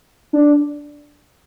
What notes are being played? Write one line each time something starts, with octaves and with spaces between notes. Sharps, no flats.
D4